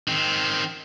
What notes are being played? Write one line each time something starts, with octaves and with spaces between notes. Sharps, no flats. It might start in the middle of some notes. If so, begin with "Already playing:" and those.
D#3 C4